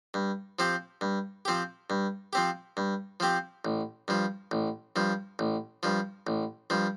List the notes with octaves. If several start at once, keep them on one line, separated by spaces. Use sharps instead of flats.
G2
F3 C4 G4
G2
F3 C4 G4
G2
F3 C4 G4
G2
F3 C4 G4
A1
G2 F3
A1
G2 F3
A1
G2 F3
A1
G2 F3